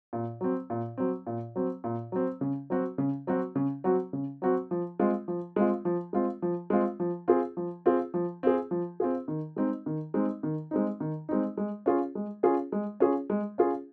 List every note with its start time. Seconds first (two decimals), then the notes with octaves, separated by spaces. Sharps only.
0.13 A#2
0.41 F#3 C4
0.70 A#2
0.98 F#3 C4
1.27 A#2
1.56 F#3 C4
1.84 A#2
2.12 F#3 C4
2.41 C#3
2.70 F#3 C4 F#4
2.98 C#3
3.27 F#3 C4 F#4
3.55 C#3
3.84 F#3 C4 F#4
4.13 C#3
4.42 F#3 C4 F#4
4.71 F3
4.99 G#3 C4 F4
5.28 F3
5.56 G#3 C4 F4
5.85 F3
6.13 G#3 C4 F4
6.42 F3
6.70 G#3 C4 F4
7.00 F3
7.28 C4 F4 G#4
7.57 F3
7.86 C4 F4 G#4
8.14 F3
8.43 C4 F4 G#4
8.71 F3
9.00 C4 F4 G#4
9.28 D#3
9.56 G#3 C4 D#4
9.86 D#3
10.14 G#3 C4 D#4
10.43 D#3
10.71 G#3 C4 D#4
11.00 D#3
11.29 G#3 C4 D#4
11.57 G#3
11.86 C#4 F4 G#4
12.15 G#3
12.43 C#4 F4 G#4
12.72 G#3
13.00 C#4 F4 G#4
13.30 G#3
13.58 C#4 F4 G#4